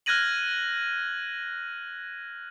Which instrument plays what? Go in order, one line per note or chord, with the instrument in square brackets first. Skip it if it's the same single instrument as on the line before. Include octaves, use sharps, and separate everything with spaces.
[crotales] F6 F#6 G#6 A#6 D#7 F#7